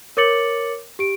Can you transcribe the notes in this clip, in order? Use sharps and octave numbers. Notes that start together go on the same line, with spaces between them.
A#4 C#5 D6 A6 C#7 F#7
G4 D7